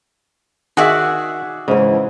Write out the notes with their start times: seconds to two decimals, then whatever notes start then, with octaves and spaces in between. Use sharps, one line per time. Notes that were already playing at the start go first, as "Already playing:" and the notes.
0.77 D#3 F#4 G#4 D5 E5 F#5
1.68 G#2 C#3 E3